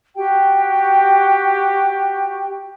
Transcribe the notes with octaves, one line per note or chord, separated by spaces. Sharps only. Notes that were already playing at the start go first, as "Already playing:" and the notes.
F#4 G4 G5